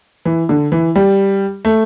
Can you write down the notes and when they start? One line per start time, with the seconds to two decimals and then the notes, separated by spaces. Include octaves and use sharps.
0.25 E3
0.49 D3
0.72 E3
0.95 G3
1.65 A3